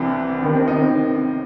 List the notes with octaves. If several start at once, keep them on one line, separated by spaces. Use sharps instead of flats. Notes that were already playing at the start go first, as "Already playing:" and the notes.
Already playing: C2 C3 E3 C4
D#2 D#3 B3
C4
D#4
C4